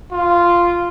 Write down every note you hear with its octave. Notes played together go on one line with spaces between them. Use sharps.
F4